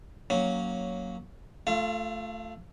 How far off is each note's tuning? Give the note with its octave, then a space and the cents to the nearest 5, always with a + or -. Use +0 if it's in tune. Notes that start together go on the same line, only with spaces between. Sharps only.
F#3 +0 A#3 +0 C#4 +5
A3 +0 F4 +0 F5 -45